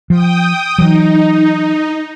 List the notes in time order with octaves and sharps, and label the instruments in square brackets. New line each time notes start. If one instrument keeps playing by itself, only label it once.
[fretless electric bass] F3 [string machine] G5 D#6
[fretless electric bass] E3 F#3 [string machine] D#4